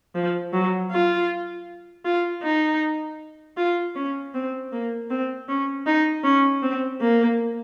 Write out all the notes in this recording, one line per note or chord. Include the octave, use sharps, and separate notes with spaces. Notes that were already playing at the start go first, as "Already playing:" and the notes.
F3
F#3
F4
F4
D#4
F4
C#4
C4
A#3
C4
C#4
D#4
C#4
C4
A#3